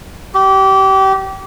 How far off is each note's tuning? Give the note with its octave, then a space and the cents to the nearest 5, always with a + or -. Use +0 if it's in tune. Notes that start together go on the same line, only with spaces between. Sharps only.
G4 -25